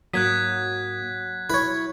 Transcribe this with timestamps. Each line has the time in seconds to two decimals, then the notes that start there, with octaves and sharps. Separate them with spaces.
0.13 G#2 F#3 A#3 D#6 F#6 G#6 B6
1.50 E4 B4 C#5